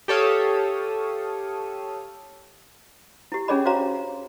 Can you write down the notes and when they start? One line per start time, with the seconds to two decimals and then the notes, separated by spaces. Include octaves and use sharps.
0.08 G4 A4 C#5 F5 D#6
3.32 E4 G4
3.48 C#4 D4 G#4 C#5 D#5 B5
3.66 F#4 C5 C#5 F5 A#5